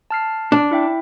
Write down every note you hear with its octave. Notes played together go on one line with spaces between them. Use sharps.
A5 F6 C7
D4
E4 E5 G5